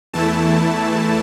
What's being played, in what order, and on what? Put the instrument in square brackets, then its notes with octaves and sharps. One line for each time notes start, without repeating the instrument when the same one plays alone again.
[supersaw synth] E2 E3 A3 E4 A5